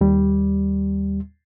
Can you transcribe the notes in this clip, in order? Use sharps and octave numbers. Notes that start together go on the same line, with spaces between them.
D#2 G3